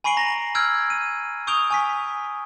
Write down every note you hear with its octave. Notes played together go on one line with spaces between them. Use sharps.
G#5 B5 C#6 C7 D7 F#7
A#5 A#6
E6 F6 G6 G#6 D7
D#7
C#6 D#6 G6 D7 F7 G7
G#5 C#6 B6